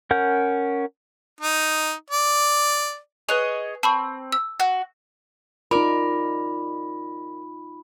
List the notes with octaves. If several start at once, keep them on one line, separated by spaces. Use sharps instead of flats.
C#4 A#4 F#5 G6
D#4
D5
G#4 B4 C#5 D#5 F#6 F7
C4 A5 B5 C#6
E6
F#4
D#4 F4 A#4 D5 B5